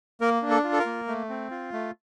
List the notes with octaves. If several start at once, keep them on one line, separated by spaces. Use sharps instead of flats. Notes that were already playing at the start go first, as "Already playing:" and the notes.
A#3 A#4
D4
A4
F4
A4
A#4
A#3
A3
C4
F4
A3